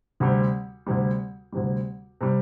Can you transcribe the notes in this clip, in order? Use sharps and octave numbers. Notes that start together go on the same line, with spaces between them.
D2 C3 G3
D2 C3 G3
D2 C3 G3
C3 G3